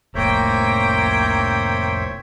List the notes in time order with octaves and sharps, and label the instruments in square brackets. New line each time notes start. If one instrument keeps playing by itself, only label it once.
[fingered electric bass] F1 A2 [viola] A#3 G5 [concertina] C5 C#5 E5